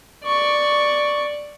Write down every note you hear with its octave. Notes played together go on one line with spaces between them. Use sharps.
D5 C#6